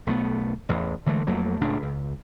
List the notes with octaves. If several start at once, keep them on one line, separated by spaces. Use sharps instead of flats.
B1 A3 B3
A1 E2
D3 E3 G#3 A3
F2 F#3 A3 A#3
C#2 A2 C#3 D4
C#2